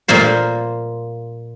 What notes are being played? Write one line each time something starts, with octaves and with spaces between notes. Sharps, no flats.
A#2 A#3 F4 C5